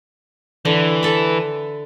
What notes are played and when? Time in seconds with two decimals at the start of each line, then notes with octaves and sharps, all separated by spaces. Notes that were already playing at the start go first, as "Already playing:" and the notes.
0.65 D3 E3
1.03 A4 E5